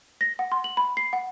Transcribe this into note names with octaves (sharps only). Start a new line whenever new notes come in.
A#6
F#5
C6
F#7
B5
C7
F#5